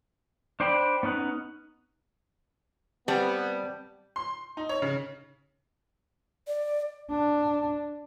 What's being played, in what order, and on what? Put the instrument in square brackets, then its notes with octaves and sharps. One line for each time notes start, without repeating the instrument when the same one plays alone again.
[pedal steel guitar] D4 C5 D5 G5 B5
B3 C#4 D#4 F#5
[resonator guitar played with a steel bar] G3 [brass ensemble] B3 [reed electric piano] C4 A5
[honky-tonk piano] C6
D#4
C#5
C#3
[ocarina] D5
[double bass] D4